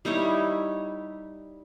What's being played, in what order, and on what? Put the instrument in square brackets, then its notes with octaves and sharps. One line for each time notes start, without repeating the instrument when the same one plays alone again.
[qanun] G3 D#4 E4 C#5